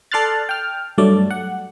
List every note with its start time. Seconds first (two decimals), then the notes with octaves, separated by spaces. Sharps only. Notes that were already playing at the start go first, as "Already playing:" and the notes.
0.12 A4 D5 C6 F6 F#6 A6
0.49 G5 F6
0.98 G2 F#3 A3 D5
1.30 F#5